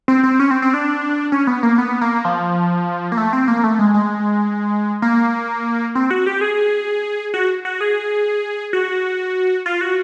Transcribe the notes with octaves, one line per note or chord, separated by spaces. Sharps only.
C4
C4
C#4
C4
C4
D4
C#4
B3
A#3
B3
A#3
F3
A#3
A3
C4
A#3
A3
G#3
G#3
A#3
C4
F#4
G4
G#4
F#4
F#4
G#4
F#4
F4
F#4